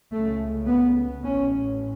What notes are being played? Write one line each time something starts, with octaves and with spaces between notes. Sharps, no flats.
C#2 C#3 A3
B3
A1 A2 C#4